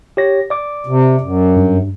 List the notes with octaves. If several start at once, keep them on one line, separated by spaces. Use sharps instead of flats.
G4 C#5 A#6
D5 D6
C3
F#2
G2